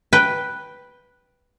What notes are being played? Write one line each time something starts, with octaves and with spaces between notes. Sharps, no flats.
B4 G5